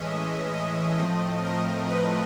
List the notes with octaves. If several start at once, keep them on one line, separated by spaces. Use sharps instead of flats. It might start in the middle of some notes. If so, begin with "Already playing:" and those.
Already playing: A2 E3 G#3 C#4 D#5 E5
D#5
A2 F3 A3 C4
A#4
B4